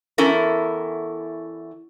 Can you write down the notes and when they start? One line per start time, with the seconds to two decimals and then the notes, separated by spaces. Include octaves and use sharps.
0.18 E2 C#4 E4 A4 A#4